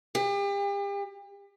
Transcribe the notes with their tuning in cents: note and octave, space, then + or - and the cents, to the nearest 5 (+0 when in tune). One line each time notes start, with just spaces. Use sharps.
G4 +40